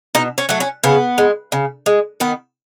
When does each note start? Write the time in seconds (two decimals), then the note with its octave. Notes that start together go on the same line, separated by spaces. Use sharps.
0.15 B2 D#4
0.38 C#4
0.49 F#3 A3
0.60 C#4
0.84 C#3 B3
1.18 G#3
1.52 C#3
1.86 G#3
2.20 D#3 B3